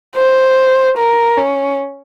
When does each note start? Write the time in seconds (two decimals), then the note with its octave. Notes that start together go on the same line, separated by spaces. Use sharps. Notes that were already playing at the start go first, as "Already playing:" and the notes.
0.16 C5
0.98 A#4
1.37 C#4